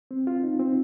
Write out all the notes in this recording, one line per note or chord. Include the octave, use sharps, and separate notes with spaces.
C4
F4
D#4
C4